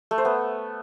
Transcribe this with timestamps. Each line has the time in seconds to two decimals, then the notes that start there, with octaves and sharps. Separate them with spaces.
0.11 A3
0.18 C5
0.25 B3